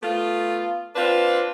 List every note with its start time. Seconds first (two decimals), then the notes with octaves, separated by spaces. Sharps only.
0.03 A3 B3 F4
0.96 C4 D4 F4 B4